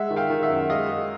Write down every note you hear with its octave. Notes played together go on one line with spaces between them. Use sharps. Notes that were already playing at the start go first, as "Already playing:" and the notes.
Already playing: G#3 E5 F#5
D#3
F5 G5
D#3
E5 F#5
F#2
G#3 D#5 F5
G#3